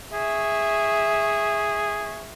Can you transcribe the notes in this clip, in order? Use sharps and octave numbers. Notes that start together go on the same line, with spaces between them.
G#4 E5 C#6